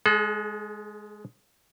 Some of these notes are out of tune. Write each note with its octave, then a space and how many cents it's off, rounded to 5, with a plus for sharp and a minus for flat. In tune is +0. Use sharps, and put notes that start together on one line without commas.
G#3 +5 A4 -45